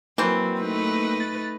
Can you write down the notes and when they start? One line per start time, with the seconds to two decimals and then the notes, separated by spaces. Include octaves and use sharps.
0.18 E3 F#3 A#3 C4
0.61 A3 D#4 B4
1.20 A6